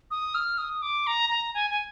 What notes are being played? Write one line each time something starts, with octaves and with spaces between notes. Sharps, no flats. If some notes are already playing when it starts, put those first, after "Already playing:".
D#6
F6
D#6
D6
A#5
A#5
G#5
G#5